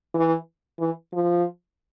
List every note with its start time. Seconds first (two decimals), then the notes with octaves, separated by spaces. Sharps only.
0.14 E3
0.80 E3
1.14 F3